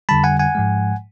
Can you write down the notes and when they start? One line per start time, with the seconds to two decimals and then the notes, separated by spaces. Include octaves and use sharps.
0.09 F2 D3 G3 A5 B5
0.24 F#5 G#5
0.40 F#5 G#5
0.55 G#2 F3 G#3